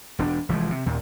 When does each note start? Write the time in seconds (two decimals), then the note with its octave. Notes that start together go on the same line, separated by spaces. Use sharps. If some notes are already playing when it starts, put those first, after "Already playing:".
0.19 E1 C#4 D4
0.49 F1 E3 F3 G#3
0.71 C3
0.86 D#2 A#2